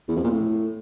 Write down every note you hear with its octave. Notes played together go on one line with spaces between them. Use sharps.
E2
F2
A#2
A2